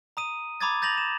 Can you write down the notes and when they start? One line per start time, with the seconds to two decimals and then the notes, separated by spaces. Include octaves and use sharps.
0.17 A#5 D#6 D#7
0.61 A#5 B5 D6 D#6 G#6 A6
0.82 G6 A6 A#6 F7 F#7
0.98 E7